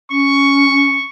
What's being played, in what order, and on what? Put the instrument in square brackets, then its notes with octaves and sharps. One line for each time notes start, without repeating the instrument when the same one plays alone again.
[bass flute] C#4 [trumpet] C#6